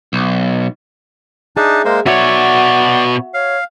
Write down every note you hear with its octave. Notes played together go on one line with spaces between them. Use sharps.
B1
D4 D#4 G#4 E5 A5
G#3 A#3 C5
B2 F#4 C#5 D5 E5 F#5
C#5 F5